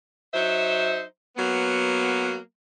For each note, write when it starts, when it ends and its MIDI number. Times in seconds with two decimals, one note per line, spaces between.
0.34 1.01 54
0.34 1.01 63
0.34 1.01 72
0.34 1.01 76
1.37 2.37 54
1.37 2.37 58
1.37 2.37 59